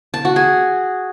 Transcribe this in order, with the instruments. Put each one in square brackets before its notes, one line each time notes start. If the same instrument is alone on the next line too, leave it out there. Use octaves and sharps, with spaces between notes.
[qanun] A5
F#4
G#4